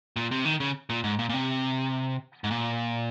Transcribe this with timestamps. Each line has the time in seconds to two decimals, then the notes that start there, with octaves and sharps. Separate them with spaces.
0.16 A#2
0.31 C3
0.45 D#3
0.60 C#3
0.90 A#2
1.04 G#2
1.19 A#2
1.29 A#2
1.34 C3
2.44 G#2
2.51 A#2